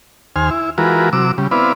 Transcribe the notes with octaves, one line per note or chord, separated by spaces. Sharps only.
D#2 C5 G#5 F6
E4
E3 G#3 F4 F#4 A#4 B4
C3 F#3 D6 E6
C#3 G3
B3 C4 E4 B4 D5 F5